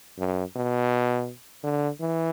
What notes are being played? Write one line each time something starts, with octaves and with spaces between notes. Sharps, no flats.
F#2
B2
D3
E3